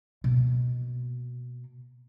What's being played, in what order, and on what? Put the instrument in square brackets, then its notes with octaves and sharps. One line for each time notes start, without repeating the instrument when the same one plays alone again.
[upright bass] B2 A#3